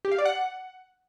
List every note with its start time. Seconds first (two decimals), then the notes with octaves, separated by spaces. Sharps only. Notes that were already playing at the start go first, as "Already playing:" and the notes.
0.05 G4
0.11 F5
0.18 D5
0.25 F#5